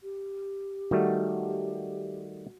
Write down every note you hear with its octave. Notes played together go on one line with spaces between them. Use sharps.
G4
D#3 G3 A3 F#4